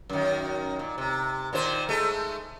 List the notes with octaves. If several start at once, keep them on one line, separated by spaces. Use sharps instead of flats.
F#2 D#3
A#2
C3
A#2 D#3 C5
G#3 A3